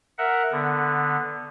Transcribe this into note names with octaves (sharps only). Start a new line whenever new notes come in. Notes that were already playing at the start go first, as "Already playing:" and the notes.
A#4 E5 F#5
D3 B3